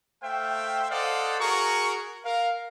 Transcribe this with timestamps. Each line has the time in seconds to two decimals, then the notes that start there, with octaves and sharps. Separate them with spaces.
0.23 A3 C5 E5 F5 G5
0.90 A4 C5 D5 D#5 F5 F#5
1.40 F#4 G#4 A#4 A#5 C#6
2.24 A#4 F5